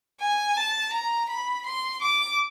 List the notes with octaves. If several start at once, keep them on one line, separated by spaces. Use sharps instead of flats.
G#5
A5
A#5
B5
C6
D6